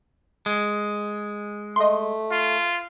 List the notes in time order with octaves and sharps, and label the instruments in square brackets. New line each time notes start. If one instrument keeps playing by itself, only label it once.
[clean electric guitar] G#3
[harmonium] A3 [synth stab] D#5 C6
[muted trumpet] F4